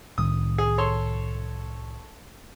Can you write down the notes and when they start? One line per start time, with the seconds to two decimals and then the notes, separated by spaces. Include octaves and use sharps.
0.18 C2 A2 D#3 D#6
0.58 G#4
0.78 A4 C#5 C6